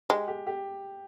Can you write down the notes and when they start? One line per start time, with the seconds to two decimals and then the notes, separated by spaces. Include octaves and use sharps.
0.10 G#3 G4
0.28 G4
0.47 G4